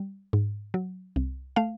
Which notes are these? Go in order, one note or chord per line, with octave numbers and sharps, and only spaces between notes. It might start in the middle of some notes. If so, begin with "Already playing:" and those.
Already playing: G3
G#2
F#3
C2
A3 F5